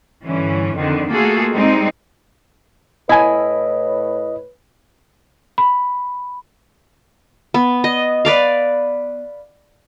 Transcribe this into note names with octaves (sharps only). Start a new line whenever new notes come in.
G2 D3 E3 C#4
F2 D3 D#3 C4
A3 A#3 F4 F#4 G#4 A4
G3 G#3 C4 D#4
A2 E4 B4 C#5 D#5 G#5
B5
B3
D#5
B4 D5 F5